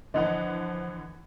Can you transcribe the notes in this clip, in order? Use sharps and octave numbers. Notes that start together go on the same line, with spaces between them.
D3 E3 F3 D#5 F#5